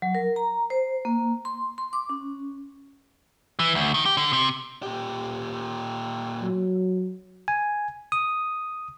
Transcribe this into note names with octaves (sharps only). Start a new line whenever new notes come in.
F#3
A#4
A#5
C5
A#3
C6
C6
D6
C#4
E3
D2
D#3
G4
D3
C3
A#2 G4
F#3
G#5
D#6